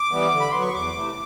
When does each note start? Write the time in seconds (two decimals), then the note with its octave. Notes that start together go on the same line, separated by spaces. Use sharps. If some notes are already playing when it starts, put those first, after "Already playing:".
Already playing: D6
0.11 E3 G3 B3
0.31 D3
0.40 B5
0.51 F#3 B3 C6
0.62 C#6
0.73 E2 D6
0.94 C3 E3 A3